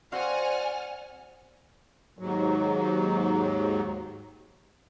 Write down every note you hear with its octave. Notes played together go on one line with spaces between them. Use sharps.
C4 F#4 D5 F5 F#5 G#5 F6
D#2 G#2 F#3